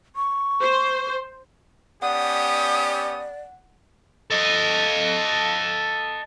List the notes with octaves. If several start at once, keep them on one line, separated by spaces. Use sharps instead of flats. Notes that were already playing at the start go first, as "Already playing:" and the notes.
C#6
C5
B3 C#4 G4 D5 F#5 D#6
A4 D#5